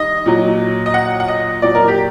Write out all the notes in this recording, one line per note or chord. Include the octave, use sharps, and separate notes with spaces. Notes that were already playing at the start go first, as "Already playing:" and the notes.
Already playing: D#3 G3 D#5
A#2 F#3
D#5
F#5
F#5
D#5
A#2 F#3 D5
A#4
G4